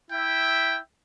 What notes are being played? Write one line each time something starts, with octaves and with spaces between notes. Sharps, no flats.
E4 E5 G5